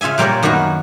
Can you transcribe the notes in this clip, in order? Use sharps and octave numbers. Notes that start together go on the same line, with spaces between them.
C#3 F4 G#4 E5 G#5
A#2 G3 A#3 C#5 D5
F#2 D#3 A#3 B3 F#4